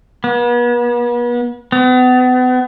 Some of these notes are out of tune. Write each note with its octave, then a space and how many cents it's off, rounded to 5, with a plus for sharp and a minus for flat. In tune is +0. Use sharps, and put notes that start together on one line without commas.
B3 -40
B3 +35